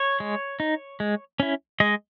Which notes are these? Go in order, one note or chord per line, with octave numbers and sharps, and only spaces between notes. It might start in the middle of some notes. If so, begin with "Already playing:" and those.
Already playing: C#5
G#3
D#4
G#3
C#4 E4
G#3 D#5